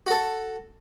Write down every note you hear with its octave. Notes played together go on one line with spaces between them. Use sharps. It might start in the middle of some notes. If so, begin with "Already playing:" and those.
F#4 A4